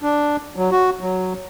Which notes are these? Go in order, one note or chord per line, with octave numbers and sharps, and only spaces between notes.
D4
F#3
F#4
F#3